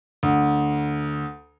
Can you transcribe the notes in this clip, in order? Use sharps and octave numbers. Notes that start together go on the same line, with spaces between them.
D2